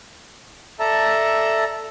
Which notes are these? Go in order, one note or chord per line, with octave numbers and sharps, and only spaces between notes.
A4 D5 E5 A5 A#5